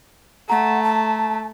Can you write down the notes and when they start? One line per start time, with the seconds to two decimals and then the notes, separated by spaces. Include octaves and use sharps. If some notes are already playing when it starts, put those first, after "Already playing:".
0.50 A3 F#5 A#5
0.83 A5